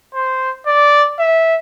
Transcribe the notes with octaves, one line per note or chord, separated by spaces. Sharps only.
C5
D5
E5